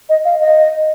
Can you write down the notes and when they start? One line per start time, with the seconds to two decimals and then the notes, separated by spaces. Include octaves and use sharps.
0.09 D#5
0.25 F5
0.40 D#5